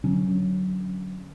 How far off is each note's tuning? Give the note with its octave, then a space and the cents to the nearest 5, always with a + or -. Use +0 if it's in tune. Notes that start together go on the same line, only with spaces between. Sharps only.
D3 +0 F#3 +5 C#4 +0